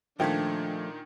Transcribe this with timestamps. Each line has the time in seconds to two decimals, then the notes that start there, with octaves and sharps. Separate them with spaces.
0.20 A#2 D#3 F3 A3 D4 G5 G#6